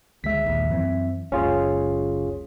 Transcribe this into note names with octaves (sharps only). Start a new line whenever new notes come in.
D2 G#3 E5 B6
A#1 D#2
F#2 E3 C4
F#1 C#2 C#4 F4 G#4